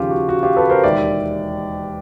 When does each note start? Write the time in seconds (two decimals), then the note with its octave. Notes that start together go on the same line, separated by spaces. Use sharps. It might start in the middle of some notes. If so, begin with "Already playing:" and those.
Already playing: D#2 C#3 F3 F4 G4
0.11 F#4
0.29 F#4
0.43 F4 G4
0.57 A4 B4
0.69 A#4 C5
0.84 E1 D#2 D#3 D5 E5